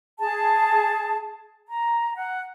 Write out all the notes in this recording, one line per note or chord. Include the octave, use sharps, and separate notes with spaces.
G#4 A5
A#5
F#5